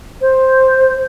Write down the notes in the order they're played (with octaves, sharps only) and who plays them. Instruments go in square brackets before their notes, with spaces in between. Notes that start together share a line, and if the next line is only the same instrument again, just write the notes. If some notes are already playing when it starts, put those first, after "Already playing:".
[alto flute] C5